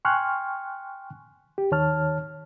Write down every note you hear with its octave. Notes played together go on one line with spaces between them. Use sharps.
G5 G#5 C6 C#6 F6 F#6
G4
D#2 D#3 C#5 A5 F6